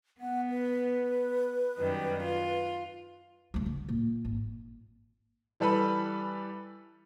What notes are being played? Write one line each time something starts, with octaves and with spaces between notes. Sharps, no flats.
B3 F#5
B4
F#2 D#3 G3
F4
D2 G2
D3
A#2
G#1
E3 G3 A4 B4 B5